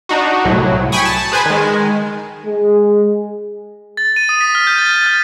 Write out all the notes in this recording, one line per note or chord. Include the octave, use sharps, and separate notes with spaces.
D4 D#4 F#4
C2 A2 F#3
G5 G#5 B5 C#6 D#6
A5
G#4 B4 C5 G#5
D#3 G#3
G#3
A6
D#7
D#6
B6
F6
G6
A6
A6
F6